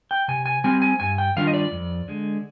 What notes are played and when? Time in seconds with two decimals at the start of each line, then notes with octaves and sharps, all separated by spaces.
0.11 G5
0.28 C3 G#5
0.46 G#5
0.64 G3 C4 G#5
0.82 G#5
1.00 G2 G#5
1.18 G5
1.36 D#3 G3 D4 F4 F5
1.47 D#5
1.54 D5
1.72 F2
2.08 D3 G#3